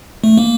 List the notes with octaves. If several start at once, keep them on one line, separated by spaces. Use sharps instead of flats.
A3
A#3